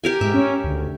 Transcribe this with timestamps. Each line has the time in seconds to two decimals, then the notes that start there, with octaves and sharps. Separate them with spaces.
0.04 G4 A#4 G#5
0.21 G#2 E5
0.34 C#4
0.64 D2